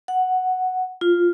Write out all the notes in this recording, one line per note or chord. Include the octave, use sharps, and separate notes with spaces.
F#5
F4